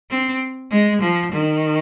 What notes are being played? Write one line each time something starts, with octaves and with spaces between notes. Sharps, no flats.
C4
G#3
F3
D#3